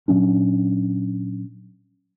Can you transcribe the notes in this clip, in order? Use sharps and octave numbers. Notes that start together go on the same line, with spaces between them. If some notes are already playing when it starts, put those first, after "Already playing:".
A#2 F#3 C#4 D4